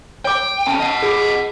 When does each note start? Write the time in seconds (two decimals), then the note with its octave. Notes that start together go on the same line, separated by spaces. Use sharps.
0.25 C#5 G5 D6
0.67 D3 C#4 A5
0.80 D#5 F#5
1.02 F4 G#4 D6